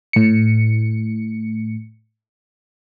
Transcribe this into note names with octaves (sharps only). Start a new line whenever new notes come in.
A2 C#7